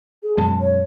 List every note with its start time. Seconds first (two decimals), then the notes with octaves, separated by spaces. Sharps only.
0.23 G#4
0.37 F#2 B2 G#3 A5
0.60 C#5